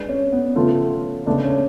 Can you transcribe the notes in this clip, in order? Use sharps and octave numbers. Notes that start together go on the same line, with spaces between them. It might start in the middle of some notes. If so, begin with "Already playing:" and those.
Already playing: G#3 D4 G#4 B4 D5
C#4
B3
C#3 F3 A3 B3 F4
C#3 G#3 A3 B3 D4
C#4